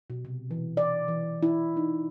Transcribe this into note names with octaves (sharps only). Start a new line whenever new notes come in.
B2
C3
E3
D5
E3
E4
D#4